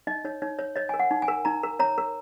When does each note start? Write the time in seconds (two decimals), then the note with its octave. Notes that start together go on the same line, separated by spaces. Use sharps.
0.07 D#4 D#5
0.24 D#4 C#5
0.42 D#4 C#5
0.59 C#5
0.76 C#5 D#5
0.89 A#4 G#5
0.99 F#5
1.11 D#4
1.22 G#5
1.28 A#4
1.45 D#4 A#5
1.63 A#4
1.80 C#5 A#5
1.98 A#4